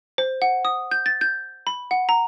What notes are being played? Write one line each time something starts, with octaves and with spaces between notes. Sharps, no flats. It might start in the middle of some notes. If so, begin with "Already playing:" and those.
C5
F#5
D#6
G6
A6
G6
B5
F#5
A#5